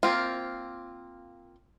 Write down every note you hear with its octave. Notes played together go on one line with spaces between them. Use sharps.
A#3 C4 F4